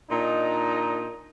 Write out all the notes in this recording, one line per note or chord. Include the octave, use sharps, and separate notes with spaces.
A#2 D4 D#4